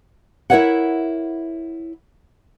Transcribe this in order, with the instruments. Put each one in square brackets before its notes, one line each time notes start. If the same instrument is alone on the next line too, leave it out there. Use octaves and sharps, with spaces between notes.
[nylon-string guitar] E4 A#4 C5 C#5 E5 F#5